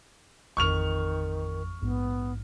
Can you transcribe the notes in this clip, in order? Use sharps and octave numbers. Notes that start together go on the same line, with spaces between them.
A1 F2 D#3 C#6 F6 F7
A#1 G#2 B3